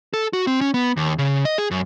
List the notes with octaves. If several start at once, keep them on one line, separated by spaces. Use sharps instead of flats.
A4
F#4
C4
C#4
B3
D#2
C#3
D#5
G#4
F#2